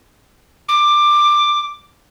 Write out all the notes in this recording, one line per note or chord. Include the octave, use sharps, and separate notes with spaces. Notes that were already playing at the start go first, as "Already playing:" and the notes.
D6